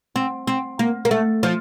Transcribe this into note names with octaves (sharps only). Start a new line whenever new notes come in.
C4
C4
A#3
A#3
A3
F3